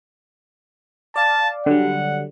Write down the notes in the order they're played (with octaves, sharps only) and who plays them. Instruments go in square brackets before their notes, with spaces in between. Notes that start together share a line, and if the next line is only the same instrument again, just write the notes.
[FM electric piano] D5 F5 [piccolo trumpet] A5
[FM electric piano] D3 F#3 G3 [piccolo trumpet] F#5